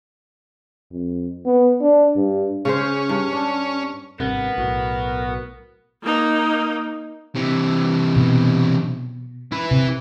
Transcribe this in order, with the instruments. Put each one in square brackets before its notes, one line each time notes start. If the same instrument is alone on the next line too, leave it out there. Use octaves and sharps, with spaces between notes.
[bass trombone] F2
B3
D4
G2
[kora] C#3 G#4 C5 [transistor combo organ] C#4
[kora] G2
D4
[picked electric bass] G#1 G2 C3 [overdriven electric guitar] B3 [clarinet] A#4
[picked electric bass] B1 A2 [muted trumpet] F#4
[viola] A#3 D#4
[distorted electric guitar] C3 E3
[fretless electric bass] B2
[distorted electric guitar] E4 B4
[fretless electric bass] C3